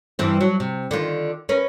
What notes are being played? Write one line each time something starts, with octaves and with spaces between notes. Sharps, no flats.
G2 E3 C4
F#3
C3
D3 D#3 F4
C#4 A#4 B4